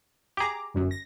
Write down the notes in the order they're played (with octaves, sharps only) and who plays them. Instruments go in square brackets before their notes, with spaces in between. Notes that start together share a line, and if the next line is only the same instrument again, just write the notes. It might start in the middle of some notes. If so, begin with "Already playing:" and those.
[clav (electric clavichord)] G4 G#4 [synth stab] A#5 D6
[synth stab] G1 F#2
A#6